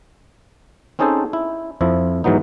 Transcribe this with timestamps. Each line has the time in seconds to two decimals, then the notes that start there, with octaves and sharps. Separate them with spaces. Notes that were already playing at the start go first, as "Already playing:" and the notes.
0.99 C4 C#4 D#4 G#4 A4 C5
1.33 E4
1.81 F2 F3 E4
2.24 G#2 E3 F#3 B3 D#4